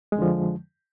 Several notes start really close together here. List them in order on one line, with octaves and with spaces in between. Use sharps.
G#3 F2 D3 F3